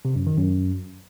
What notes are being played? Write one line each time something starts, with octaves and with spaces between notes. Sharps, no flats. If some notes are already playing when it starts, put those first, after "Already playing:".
C3
F#2
D#3
F#2